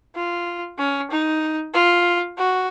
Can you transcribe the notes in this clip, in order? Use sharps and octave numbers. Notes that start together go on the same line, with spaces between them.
F4
C#4
D#4
F4
F#4